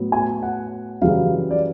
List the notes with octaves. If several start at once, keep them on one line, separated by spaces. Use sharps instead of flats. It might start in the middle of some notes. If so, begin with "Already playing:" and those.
Already playing: A2 F#3 B3
G#5
F#5
F#2 C#3 E3 G3 F5
D5